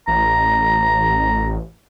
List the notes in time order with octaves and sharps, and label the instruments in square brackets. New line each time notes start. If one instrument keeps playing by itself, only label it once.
[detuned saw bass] A1 [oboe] A#5